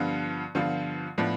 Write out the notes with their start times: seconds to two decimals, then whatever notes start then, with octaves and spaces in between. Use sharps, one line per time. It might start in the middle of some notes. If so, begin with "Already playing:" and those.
Already playing: G2 D3 F3 B3 F4
0.55 G2 D3 F3 B3 F4
1.18 A2 F3 B3 D4